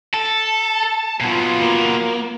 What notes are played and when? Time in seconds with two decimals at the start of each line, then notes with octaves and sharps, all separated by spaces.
0.14 A4 A5
1.21 A#2 F#3 B3 F4
1.62 A#3